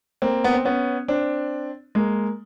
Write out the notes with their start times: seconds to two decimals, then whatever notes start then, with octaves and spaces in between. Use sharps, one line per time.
0.22 A#3 C4
0.44 B3
0.54 C4
0.65 B3 C#4
1.08 C4 D4
1.95 G#3 A#3